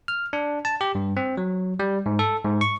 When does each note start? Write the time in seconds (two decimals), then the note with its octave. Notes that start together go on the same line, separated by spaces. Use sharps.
0.08 F6
0.33 D4
0.65 A5
0.81 G4
0.95 G2
1.17 C4
1.37 F#3
1.79 G3
2.06 G#2
2.19 A4
2.45 G#2
2.61 C#6